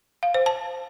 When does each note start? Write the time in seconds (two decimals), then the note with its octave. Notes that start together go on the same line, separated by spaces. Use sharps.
0.23 F5
0.34 C5
0.46 A5